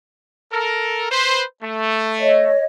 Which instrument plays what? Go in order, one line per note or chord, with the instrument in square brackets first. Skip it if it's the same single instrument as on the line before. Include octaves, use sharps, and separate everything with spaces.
[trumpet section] A4 A#4
B4 C5
A3
[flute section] C#5 D#5